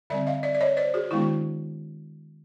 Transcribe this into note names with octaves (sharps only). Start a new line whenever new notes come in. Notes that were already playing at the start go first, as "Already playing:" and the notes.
D3 G3 C4 D5 E5
D#5 F5
D5 E5
D5
C#5 D#5
C5 D5
F#4 G#4
D#3 G#3 B3 D4 E4 F#4